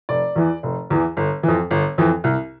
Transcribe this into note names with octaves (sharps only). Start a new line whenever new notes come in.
F1 D5
E2 E3
F1
E2 E3
G1
F2 E3
G1
F2 E3
C2